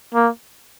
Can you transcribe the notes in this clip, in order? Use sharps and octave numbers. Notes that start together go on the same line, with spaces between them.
A#3